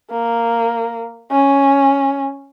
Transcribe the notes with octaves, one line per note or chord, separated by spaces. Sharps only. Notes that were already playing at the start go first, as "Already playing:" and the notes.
A#3
C#4